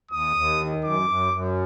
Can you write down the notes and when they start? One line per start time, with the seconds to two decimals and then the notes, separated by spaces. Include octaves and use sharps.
0.11 D#2 D#6
0.36 D#2
0.60 D#3
0.84 F#2 D6
1.09 F#2
1.33 F#2